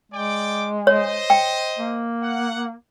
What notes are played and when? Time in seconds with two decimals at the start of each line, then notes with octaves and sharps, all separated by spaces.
0.12 G#3 D5 G5 D6
0.87 C5 C#5 D#5
1.30 G5
1.79 A#3
2.22 F#5